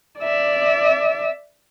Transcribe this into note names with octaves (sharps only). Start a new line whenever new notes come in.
D5 E5